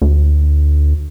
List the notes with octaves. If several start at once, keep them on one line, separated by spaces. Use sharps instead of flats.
D2